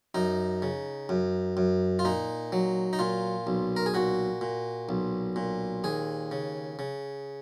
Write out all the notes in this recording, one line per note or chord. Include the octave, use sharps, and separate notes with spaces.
F#2 D#4
C#3
F#2
F#2
F4
A#2 D#4
F#3
D#4
A#2 F4
B1
A#4
G#4
A#2 F#4
A#2
B1
A#2
D#2 G#4
C#3
C#3